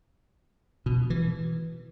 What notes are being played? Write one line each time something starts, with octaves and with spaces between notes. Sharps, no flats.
B2
E3